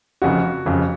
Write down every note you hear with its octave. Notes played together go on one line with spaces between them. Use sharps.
F1 F2 C#3 F#4
F1 F2 C#3